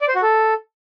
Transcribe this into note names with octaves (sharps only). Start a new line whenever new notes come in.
D5
C5
F#4
A4